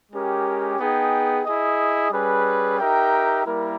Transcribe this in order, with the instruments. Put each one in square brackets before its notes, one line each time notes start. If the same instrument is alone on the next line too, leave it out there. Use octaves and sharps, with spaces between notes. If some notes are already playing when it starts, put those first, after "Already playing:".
[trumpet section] G#3 C#4 G4 A#4
B3 D#4 G#4 D#5 G5
E4 G#4 D#5
G3 C#4 G#4 B4
D#4 G4 A#4 E5 G5
G3 A#3 E4 A#4